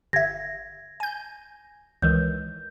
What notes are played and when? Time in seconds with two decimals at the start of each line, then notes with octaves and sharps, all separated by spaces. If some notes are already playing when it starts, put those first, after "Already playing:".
0.13 G1 E5 G#6 A#6
1.00 G#5 G6
2.02 C#2 D#3 E3 G6